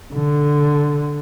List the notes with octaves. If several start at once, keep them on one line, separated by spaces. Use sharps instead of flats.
D3